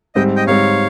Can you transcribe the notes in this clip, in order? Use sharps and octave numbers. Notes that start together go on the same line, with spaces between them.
G#2 G3 C4 D#5 G5
D#5 G5
G#2 G3 C4 C#5 F5